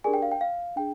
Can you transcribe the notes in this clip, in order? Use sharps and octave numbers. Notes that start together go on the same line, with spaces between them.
D4 G4 G#4 A#4 D5 G#5
G5
F5
G5
F5
D4 G#4 G5